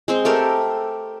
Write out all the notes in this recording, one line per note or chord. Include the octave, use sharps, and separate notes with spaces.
G#3 C4 C5
A3 G4 A4 A#4